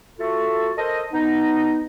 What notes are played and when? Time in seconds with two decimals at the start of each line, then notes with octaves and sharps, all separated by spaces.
0.19 A3 F4 F#4 A4
0.78 A4 A#4 C5 D#5
1.13 B3 D#4